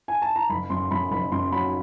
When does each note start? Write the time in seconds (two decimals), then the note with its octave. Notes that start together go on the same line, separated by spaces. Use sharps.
0.08 G#5
0.22 A5
0.36 A#5
0.50 F#1 B5
0.70 F#2 C6
0.91 F#2 B5
1.11 F#1 B5
1.32 F#2 C6
1.52 F#3 B5